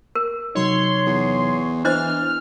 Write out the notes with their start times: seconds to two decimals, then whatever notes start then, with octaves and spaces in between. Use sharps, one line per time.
0.15 A#4
0.55 C3 F#3 D#4 C#5 C6
1.06 E2
1.85 E3 B3 D4 C5 D#5 F6